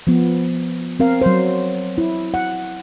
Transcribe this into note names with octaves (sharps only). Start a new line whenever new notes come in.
F3 B3
C4 A#4 F5
F#3 C5
E4
F#5